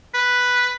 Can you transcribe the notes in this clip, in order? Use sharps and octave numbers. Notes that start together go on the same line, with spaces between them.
B4